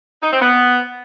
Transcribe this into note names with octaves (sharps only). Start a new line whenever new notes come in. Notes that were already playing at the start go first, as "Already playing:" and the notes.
D#4
C4
B3